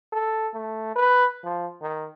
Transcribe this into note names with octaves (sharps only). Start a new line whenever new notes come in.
A4
A3
B4
F3
D#3